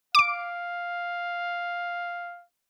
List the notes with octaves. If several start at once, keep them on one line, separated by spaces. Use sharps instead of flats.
F5 D6 D7